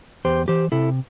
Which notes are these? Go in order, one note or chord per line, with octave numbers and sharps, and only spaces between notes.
E2 G4 C5
E3 G4 C5
C3 E4 A4